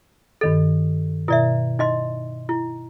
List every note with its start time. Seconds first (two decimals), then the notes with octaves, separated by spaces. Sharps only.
0.41 G2 D#3 A4 A6
1.28 B2 E4 D5 E5
1.79 D#4 D#5 C6
2.49 E4